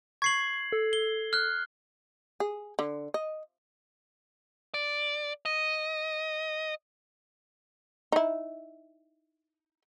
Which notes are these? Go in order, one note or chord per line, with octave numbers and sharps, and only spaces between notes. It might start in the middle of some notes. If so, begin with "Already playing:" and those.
C#6 G#6 C7 F#7
A4
G7
F6 F#6
G#4
D3
D#5
D5
D#5
D#4 E4